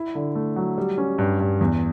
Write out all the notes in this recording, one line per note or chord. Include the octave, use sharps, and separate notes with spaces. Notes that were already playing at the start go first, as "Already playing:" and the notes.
Already playing: E4
D3
A3
F#3
G3
C#4
G2
G2
E2